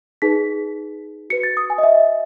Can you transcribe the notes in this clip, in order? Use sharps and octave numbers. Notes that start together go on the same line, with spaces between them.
D#4 G#4 B4 B6
F#4 B4 C#7
A6
D#6
G#5
D#5
E5